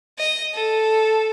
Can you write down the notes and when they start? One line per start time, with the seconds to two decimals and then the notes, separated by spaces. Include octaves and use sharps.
0.18 D#5
0.54 A4